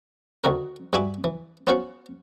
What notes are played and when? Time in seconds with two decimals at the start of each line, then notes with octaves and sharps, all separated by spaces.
0.44 D2 D#3 F#4 A#4
0.93 G2 F#4 E5 G#5 B5 D6
1.24 E3
1.67 B3 C#4 F4 F#4 C5 F#5